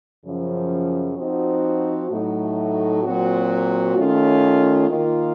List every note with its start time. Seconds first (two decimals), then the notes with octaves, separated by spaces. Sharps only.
0.24 F#2 C#3 F3
1.18 F3 C4 D#4 F#4
2.10 A2 F#3 A3 D#4 F#4
3.04 A#2 F#3 C4 F#4
3.96 D#3 A3 C#4 F4
4.89 D#3 A#3 F4